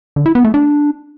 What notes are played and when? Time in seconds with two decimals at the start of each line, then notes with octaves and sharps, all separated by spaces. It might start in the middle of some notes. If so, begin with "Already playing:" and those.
0.16 D3
0.26 E4
0.35 B3
0.45 A3
0.54 D4